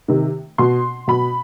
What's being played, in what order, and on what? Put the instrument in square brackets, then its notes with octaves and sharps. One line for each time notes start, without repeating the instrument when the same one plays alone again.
[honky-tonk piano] C3 D#3
B2 C6
B2 B5